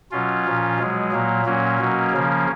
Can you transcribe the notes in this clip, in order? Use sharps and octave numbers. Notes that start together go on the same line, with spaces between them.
B2 F#3 C#4 F4
A#2 F3
B2 F#3 G#3
A#2 F#3 A#3
A#2 F#3 A#3 C#4
B2 F#3
C#3 F3